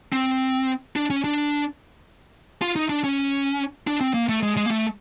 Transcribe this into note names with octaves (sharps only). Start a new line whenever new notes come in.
C4
D4
C#4
D4
F4
D#4
D4
C#4
D4
C4
A#3
A3
G#3
G#3
A#3
A3